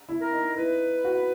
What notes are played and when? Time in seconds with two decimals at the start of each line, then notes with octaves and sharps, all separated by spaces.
0.09 E4
0.20 A#4
0.33 D#4
0.56 E4 B4
1.05 F#4